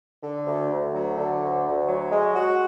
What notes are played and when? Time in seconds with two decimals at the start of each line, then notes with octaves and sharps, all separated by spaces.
0.23 D3
0.47 D2
0.71 D2
0.94 F#3
1.18 D3
1.41 D2
1.65 D2
1.88 F#3
2.11 G#3
2.35 F#4